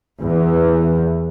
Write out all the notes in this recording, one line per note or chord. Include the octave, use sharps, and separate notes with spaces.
E2 E3